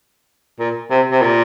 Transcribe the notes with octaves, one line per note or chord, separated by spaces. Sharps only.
A#2
C3
C3
A#2